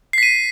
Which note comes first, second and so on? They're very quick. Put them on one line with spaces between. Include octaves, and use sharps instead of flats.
C7 B6 D#7